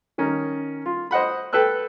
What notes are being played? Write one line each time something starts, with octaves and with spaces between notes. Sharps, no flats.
D#3 C#4 A#4
F4
C5 D#5 F#5 B5
A4 B4 G5 E6 F#6